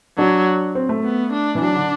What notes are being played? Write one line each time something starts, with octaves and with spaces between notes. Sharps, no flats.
F#3 D4
C4
A3
B3
D4
E3
F#3 D4
D3